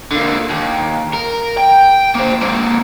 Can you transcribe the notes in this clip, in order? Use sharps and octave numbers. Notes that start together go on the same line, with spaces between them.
D3 A#3
D#2
A#4
G5
A#3 C5
A#3 C4